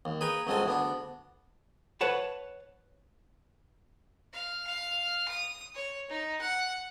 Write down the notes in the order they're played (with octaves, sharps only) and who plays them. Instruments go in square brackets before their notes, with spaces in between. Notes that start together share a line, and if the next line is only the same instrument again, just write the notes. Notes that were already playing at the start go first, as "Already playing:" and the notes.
[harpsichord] D#2
G#4 B4 G5 A#5 C#6
C#2 F#3 G#3 C4 A4 G#5
D2 B3 D4
[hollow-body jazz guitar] B4 C#5 F#5 A5 B5
[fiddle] F5
F5
D#6
C#5
D#4
F#5